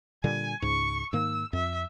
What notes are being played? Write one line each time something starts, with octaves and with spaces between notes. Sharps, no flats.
A#2 D3 G3 G#5
C#2 G#2 C#6
G#2 D#3 A#3 E6
F2 E5